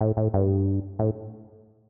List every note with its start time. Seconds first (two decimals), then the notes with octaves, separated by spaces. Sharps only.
0.01 A2
0.17 A2
0.34 G2
0.99 A2